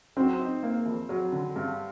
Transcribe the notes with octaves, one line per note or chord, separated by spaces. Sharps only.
F#3 C4
D#4
A#3
F2
F#3
D3
G2